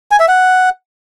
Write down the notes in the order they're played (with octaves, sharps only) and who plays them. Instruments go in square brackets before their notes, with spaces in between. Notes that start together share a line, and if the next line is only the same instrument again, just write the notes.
[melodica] G#5
E5
F#5